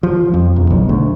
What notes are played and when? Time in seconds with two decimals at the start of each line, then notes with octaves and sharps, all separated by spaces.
0.03 F3
0.34 F2
0.56 E1
0.70 B1
0.89 D2